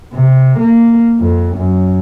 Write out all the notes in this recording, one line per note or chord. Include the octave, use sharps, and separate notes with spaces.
C3
A#3
F2
F#2